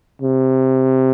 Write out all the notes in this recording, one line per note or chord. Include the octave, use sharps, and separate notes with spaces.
C3